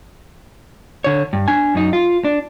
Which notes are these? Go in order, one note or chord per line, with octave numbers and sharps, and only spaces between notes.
D3 C#5
G2
D4 G#5
F#2 D#4
F4
D4